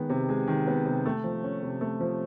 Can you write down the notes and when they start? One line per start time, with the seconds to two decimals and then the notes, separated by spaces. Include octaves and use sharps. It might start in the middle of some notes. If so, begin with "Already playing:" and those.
Already playing: D#3 G#3 B3
0.09 C3
0.29 G#3
0.47 D#3
0.67 B3
0.85 C3
1.06 A3
1.24 F3
1.44 C#4
1.63 C3
1.81 A3
2.00 F3